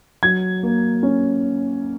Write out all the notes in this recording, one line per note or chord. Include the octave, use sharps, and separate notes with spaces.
F#3 G#6
A#3
C#4